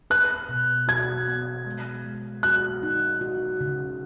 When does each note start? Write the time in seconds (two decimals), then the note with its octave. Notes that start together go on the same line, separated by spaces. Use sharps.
0.10 B4 F#6
0.49 B2
0.88 F#4 G#6
1.28 B3
1.66 G#3
2.05 G#3
2.43 F#4 F#6
2.83 D#4
3.21 F#4
3.61 C#3